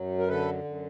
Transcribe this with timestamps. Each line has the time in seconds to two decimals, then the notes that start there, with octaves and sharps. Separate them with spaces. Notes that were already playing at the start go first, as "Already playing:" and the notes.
Already playing: F#2 F#3
0.18 A#4
0.28 D3 A4 B4
0.64 F#2